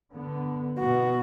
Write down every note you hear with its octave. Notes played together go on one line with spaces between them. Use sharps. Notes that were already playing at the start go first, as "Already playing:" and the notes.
D3 B3
B2 B3 F#4